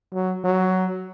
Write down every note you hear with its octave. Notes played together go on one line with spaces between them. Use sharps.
F#3
F#3